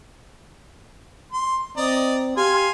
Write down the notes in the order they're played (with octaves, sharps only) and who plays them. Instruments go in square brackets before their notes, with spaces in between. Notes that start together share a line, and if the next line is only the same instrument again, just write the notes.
[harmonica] C6
[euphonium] C4 [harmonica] D5 D#5 A#5
[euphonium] G4 [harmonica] F5 G#5 C6